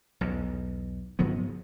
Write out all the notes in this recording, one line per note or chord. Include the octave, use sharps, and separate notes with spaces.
B1 E2
G#2 F3 F#3 B3